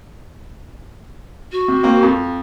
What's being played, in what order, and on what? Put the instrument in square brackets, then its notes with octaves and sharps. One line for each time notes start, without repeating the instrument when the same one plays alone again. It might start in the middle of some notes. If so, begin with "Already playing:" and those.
[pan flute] F#4
[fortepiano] C3
A#3 C4
F2